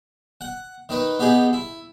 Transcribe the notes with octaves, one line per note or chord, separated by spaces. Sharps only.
F#5
D#3 D#4 B4
B3 D#4 G4 G#4
E4